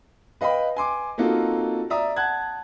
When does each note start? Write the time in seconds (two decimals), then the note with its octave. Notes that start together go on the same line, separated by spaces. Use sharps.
0.41 B4 D#5 F5 G5 B5
0.77 G#5 C6 D6
1.18 A#3 C4 D#4 F4 F#4 A4
1.90 D5 E5 A#5 D#6
2.16 F#5 A5 F#6 G#6